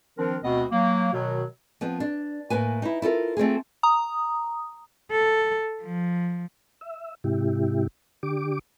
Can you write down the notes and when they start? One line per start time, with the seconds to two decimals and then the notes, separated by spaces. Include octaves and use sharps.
0.18 D#3 F3 C4 D4 A#4
0.43 D2 B2 B3 C4 F#4 D#5
0.72 F#3 A#3
1.13 B2 D#3 F#3
1.81 F3 B3 C4
2.00 D4
2.50 A2 A#3 B4 G#5
2.82 D#4 E4
3.02 E4 F4 A4 A#4
3.37 A3 C4 F4 G#4
3.83 A#5 D#6
5.12 A4
5.83 F3
6.81 E5
7.24 G#2 C3 E4 G4
8.23 D3 G4 D6